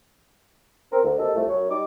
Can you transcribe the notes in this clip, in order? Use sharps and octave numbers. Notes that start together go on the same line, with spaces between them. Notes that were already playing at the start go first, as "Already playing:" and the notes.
C4 A#4
D2
C3 A#3 A4 D#5
C2 F3 A3
F#2 C#5
G3 D#4 D6